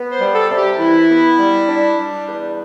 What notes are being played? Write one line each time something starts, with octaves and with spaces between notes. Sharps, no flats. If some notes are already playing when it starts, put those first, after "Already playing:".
Already playing: B3
C5
G3
A4
C3
G4
E3 E4
B3
G3
D4
G3
E2